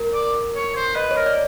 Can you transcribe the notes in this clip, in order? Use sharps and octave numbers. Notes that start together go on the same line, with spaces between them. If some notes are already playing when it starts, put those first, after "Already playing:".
Already playing: A#4
D5
C#5
C5
B4 D#5
C#5
A#4
D5